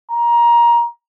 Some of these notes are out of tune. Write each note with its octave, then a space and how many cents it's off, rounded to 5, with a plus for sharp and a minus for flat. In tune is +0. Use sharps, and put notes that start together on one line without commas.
A#5 +20